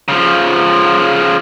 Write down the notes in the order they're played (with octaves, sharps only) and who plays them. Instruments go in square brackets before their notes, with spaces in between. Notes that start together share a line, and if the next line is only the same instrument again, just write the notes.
[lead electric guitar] C#3 F3